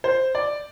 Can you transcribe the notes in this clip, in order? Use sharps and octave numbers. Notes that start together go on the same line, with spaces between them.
C5
D5